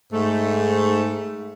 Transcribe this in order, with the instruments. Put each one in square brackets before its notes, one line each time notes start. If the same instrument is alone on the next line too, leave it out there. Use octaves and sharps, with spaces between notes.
[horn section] G#2 A3